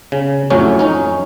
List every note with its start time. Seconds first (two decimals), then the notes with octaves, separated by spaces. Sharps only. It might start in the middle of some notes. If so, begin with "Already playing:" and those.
0.12 C#3
0.50 F2 A2 F#3 C#4
0.79 C#4 D#4